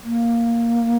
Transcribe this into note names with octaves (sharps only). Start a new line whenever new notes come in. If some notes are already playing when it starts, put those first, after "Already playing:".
A#3